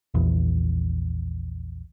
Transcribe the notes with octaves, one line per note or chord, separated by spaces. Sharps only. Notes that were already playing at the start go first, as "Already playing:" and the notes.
A#1 E2